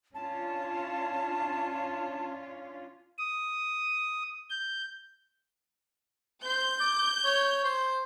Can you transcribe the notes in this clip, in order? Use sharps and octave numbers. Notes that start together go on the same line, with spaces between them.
C#4 D4 F4 A5
D#6
G6
C5 G6
D6
C#5
C5